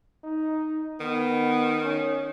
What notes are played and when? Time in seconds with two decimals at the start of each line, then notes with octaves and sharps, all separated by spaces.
0.24 D#4
1.00 D#3 B3
1.85 C#4